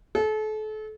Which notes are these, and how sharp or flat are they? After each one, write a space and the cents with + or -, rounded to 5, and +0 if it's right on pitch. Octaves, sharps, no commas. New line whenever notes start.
A4 -35